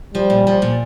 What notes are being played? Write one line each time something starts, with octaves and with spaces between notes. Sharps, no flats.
F3 G3
A#2
F3
A#2